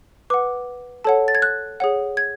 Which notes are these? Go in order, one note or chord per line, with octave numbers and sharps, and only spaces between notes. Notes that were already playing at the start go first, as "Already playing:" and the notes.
B4 F#5 D6
A4 C#5 F#5 A5
A6
G#6
F#6
G#4 C#5 F#5
G#6